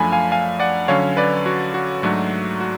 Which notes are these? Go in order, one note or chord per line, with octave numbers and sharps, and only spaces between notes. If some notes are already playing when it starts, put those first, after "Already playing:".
Already playing: F#2 F3 A3 D4 G#5 B5
F5 G#5
F5 G#5
D5 F#5
D3 F#3 C#4 C#5 F5
B4 D5
F#4
F#4
G#2 F#3 A3 D4 F#4
F#4